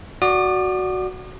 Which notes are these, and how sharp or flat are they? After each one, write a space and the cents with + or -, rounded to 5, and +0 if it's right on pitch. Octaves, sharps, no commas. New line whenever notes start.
F#4 +0 D5 +0 D#6 -45